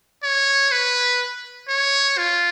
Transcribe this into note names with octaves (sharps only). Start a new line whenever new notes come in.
C#5
B4
C#5
F4